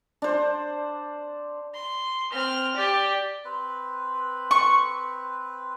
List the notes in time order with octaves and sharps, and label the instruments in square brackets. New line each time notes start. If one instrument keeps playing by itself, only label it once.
[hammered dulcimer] D4 C5
[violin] C6
C4 F6
G4 D5
[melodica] C4 B4
[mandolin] C#6